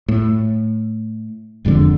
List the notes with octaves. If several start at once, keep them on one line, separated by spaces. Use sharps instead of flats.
A2
E1 F2 G#2 D3